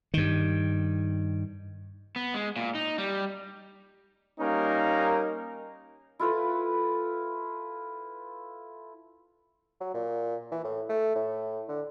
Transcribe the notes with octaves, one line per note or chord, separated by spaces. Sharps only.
G2 D#3
B3
G#3
A#2
D#4
G3
G3 A#3 C#4 D#4 A#4
E4 F4 A4 B4
F#3
A#2
E3
A2
A3
A2
D3